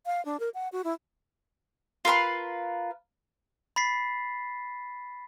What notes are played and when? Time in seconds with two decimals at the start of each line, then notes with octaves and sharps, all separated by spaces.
0.06 F5
0.25 D4
0.40 A#4
0.54 F#5
0.72 F#4
0.84 E4
2.05 F4 A#4 B4 C6
3.76 B5 A6 B6 C7